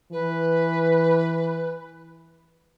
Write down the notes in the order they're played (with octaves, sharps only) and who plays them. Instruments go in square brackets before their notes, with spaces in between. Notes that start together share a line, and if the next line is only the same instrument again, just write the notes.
[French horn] E3 [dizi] B4